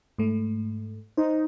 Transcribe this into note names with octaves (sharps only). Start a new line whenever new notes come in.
G#2 A3
D#4 C5